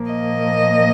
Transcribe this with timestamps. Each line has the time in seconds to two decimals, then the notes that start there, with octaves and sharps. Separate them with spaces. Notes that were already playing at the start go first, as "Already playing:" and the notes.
Already playing: A#2 F3 A#3
0.11 D#5